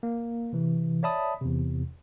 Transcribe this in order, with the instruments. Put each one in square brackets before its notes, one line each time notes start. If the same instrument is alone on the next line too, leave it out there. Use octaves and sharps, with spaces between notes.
[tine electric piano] A#3
C3 E3
C#5 D5 E5 A5 B5 D#6
E2 C3